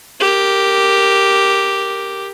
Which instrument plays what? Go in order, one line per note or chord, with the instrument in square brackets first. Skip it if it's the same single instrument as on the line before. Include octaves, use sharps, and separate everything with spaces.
[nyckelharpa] G4 A#4